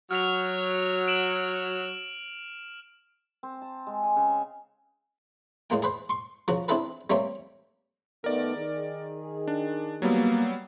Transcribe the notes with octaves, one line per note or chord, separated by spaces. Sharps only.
F#3 F6 F7
D7 E7 F#7
C4
A5
G#3
G#5
C#3
A2 G#3 A#3 G5
G#4 B4 C5
C6 C#6
C#3 F3 F#4
C4 D4 E4 G#4 A4 B4
G3 A3 A#3 C4 C#5 G5
D#3 A3 B3 A#4 D5
D#3 G#4
D4
F#3 G3 A#3 B3